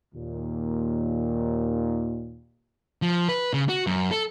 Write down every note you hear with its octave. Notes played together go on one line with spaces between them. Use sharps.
D#2 A#2
F3
B4
C#3
F#4
F#2
A4